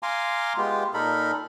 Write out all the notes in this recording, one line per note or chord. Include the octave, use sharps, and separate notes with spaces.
F5 G#5 A#5 C6 D6
G#3 B3 F4 G4
A#2 D#4 A4 A#4 B5